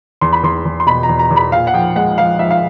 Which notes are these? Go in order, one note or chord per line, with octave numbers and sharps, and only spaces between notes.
E2 C6
B5
E2 C6
E2
C6
B2 B5
A#5
E2
A#5
E2
B5
A#2 F5
F#5
F3 G5
G#3 F#5
F3 F5
F3 E5
F5